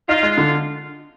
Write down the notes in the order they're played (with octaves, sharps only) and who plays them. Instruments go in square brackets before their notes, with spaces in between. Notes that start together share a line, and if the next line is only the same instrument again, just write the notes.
[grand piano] D#4 [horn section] F4
[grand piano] G#3
D3